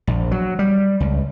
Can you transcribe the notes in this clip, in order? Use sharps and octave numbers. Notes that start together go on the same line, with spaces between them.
A#1
F#3
G3
C#2